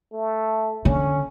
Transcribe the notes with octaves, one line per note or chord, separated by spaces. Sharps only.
A3
D3 C#4